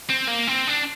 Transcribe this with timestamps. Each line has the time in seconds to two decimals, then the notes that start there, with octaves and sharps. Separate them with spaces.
0.10 C4
0.28 A#3
0.47 C4
0.67 D4